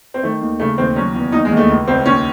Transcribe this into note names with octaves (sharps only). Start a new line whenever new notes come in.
C4
D#3 A3
D#2
C#3 A3
D#2 C4
F#3 C#4
E2
D#2 D#4
G#3
D#2
A3
C#2
C#2 C4
D#2 C#4